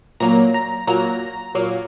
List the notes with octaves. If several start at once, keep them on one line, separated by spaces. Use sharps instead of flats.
A#2 F#3 A#3 A#5
A#5
A#2 F#3 A#3 A#5
A#2 F#3 A#3